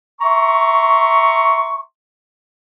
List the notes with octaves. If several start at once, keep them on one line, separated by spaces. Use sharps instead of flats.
E5 A#5 C6 C#6